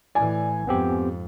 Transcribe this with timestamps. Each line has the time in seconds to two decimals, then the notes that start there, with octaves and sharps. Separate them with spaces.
0.15 A2 E3 D5 G#5
0.67 F2 G#2 B3 C4 G4